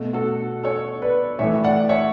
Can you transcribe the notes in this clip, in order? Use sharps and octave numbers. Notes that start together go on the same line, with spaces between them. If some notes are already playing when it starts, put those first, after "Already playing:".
Already playing: B2 A3
F#4 A4
A4 C#5
B4 D5
A2 E3 A3 C#5 E5
D5 F#5
C#5 E5